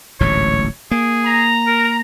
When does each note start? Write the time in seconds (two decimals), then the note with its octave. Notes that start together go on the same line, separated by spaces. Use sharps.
0.21 D1 A1 G#2 C#5
0.91 A#3 G#4
1.24 A#5
1.67 A#4